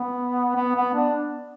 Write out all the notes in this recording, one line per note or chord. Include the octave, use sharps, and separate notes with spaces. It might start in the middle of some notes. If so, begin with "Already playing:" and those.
Already playing: B3
B3
B3
D4